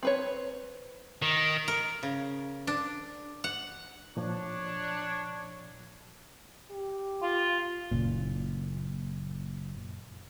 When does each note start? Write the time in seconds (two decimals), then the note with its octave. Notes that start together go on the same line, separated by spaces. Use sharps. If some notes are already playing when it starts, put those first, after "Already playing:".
0.03 C4 B4 C#5
1.22 D#3
1.68 A#4
2.03 C#3
2.67 D4
3.44 F#5
4.17 A#2 F3 D4 C#5
6.71 G4
7.23 F4
7.91 F#1 A#2